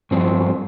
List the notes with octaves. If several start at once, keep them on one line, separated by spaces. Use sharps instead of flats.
G2 F3 C4